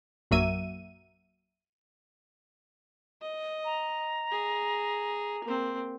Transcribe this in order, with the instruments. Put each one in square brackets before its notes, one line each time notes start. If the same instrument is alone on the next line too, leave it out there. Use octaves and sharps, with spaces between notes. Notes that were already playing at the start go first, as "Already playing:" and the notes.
[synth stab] A#1 F#2 F#3 A#3 E5 D#7
[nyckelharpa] D#5
[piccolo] A#5
[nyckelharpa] G#4
A#3 C4